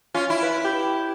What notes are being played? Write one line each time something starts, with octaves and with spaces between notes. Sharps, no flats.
C#4 F4
E4
B4
G4